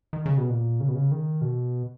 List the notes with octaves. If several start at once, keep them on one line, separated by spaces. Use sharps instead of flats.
D#3
C#3
B2
A#2
C#3
B2
C#3
D#3
B2